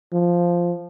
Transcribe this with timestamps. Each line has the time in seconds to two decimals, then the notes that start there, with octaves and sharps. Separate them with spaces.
0.13 F3